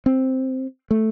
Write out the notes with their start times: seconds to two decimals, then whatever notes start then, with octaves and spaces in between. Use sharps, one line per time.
0.06 C4
0.91 A3